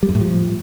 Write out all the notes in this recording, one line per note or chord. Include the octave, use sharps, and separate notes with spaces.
G3
F#2
A2
F3